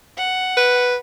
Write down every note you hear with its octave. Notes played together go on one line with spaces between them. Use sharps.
F#5
B4